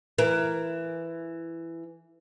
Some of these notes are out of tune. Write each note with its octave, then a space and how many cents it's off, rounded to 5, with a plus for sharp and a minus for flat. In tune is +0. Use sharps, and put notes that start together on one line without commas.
E3 +10 A#4 +0